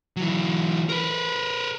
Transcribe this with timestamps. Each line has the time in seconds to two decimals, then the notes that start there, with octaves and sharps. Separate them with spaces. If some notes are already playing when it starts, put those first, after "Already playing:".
0.17 E3 F#3
0.89 A#4 B4